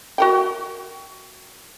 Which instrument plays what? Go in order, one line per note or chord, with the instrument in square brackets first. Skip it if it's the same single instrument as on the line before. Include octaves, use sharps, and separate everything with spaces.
[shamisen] F#4 A#4 G5